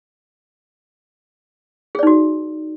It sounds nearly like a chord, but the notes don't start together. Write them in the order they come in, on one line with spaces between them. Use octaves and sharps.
G#4 D5 D#4 F#4